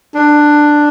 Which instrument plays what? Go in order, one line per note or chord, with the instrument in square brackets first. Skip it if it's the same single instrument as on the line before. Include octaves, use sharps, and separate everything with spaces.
[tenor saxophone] D4